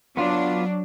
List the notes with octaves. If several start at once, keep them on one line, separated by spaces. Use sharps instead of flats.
F#3 B3 D4 F4